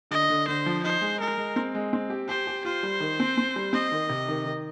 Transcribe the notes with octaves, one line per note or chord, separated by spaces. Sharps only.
D3 D#5
D3
D3 C5
F3
D#4 C5
G#3
G#3 A#4
G#3
C4
G#3
C4
G4
G4 C5
G4
F4 C5
G3
D#3
C4
C4
G3
C4 D#5
D#3
C3
D#3
D#3